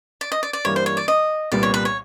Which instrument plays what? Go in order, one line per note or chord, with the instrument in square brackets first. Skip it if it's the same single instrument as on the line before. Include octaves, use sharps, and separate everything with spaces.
[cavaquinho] D5
D#5
D5
D5
[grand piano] G2 E3 G3 A#3 [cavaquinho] C#5
[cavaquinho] C5
C#5
D5
D#5
[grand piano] C2 A#2 G3 B3 [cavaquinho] D5
[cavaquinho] C#5
B4
C#5